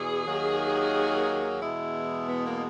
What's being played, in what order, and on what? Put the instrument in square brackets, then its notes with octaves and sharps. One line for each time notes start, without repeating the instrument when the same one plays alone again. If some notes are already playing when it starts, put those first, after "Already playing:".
Already playing: [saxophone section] E2 B2 G#4
D#2 D#3 F#3 A#3
E2 B2 G#3 E4
B3
A#3